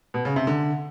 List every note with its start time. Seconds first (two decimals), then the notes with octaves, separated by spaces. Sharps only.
0.14 B2
0.25 C#3
0.36 C3
0.47 D3